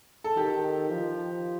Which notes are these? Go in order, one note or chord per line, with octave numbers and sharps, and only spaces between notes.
A4
D#3 G4
F3